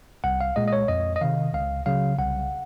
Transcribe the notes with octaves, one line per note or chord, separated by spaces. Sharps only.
C2 F#5
F5
A#2 G#3 D#5
D#5
C#5
F2 D#5
D#5
C3 D#3 F5
C#2 F5
C#3 F#3 F5
C2 F#5